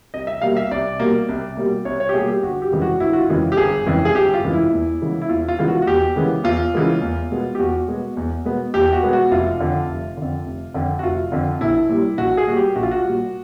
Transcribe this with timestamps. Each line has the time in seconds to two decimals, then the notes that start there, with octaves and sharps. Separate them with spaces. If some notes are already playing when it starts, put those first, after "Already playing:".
0.14 C2 D#5
0.27 E5
0.42 B2 G3 A#3 F5
0.57 E5
0.71 C2 D5
1.00 B2 G3 A#3
1.29 C2
1.57 B2 G3 A#3
1.85 C2 C#5
2.00 C#5
2.09 G4
2.14 B2 G3 A#3 G#4
2.28 G4
2.43 G1 F#4
2.62 G4
2.72 F2 C#3 E3 G#3
2.82 F#4
3.00 G1 E4
3.13 F#4
3.19 F4
3.30 F2 C#3 E3 G#3
3.52 G4
3.57 G1 G#4
3.86 F2 C#3 E3 G#3
4.05 G#4
4.15 G1 G4
4.34 F4
4.44 F2 C#3 E3 G#3
4.53 E4
4.72 E2
5.02 C#3 E3 G#3 B3
5.22 E4
5.29 E2 F4
5.48 F4
5.58 C#3 E3 G#3 B3 F4
5.68 F#4
5.82 F#4
5.87 E2 G4
6.16 C#3 E3 G#3 B3
6.44 E2 F4
6.74 C#3 E3 G#3 B3
7.02 E2
7.31 B2 G#3 B3
7.55 G4
7.59 E2 F#4
7.88 B2 G#3 B3
8.17 E2
8.45 B2 G#3 B3
8.74 E2 G4
8.93 F#4
9.03 B2 G#3 B3
9.13 F#4
9.31 F1 F4
9.60 F2 D3
9.89 F1
10.17 F2 D3
10.46 F1
10.74 F2 D3
10.99 F#4
11.03 F1 F4
11.32 F2 D3
11.61 A#1 E4
11.89 A#2 G3
12.18 A#1 F#4
12.37 G#4
12.47 A#2 G3 F#4
12.57 G4
12.76 A#1 F#4
12.83 F4
12.91 F#4
13.04 A#2 G3